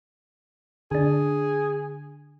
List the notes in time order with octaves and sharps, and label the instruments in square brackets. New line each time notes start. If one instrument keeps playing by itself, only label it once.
[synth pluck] D3 D4 [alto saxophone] G#4